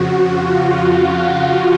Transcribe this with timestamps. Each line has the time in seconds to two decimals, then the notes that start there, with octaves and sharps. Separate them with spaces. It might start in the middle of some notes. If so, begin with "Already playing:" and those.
Already playing: F2 C#3 F3 F#4
0.28 F4